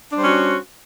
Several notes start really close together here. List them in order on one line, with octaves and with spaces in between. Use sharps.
D4 G3 C5 C#4 F#4